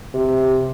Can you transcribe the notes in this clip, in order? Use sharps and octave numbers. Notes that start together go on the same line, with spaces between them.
C3